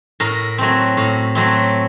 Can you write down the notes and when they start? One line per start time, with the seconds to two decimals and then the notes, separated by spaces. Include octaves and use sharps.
0.20 A2 A#4
0.58 F#3 A3 C4
0.97 A2
1.35 F#3 A3 C4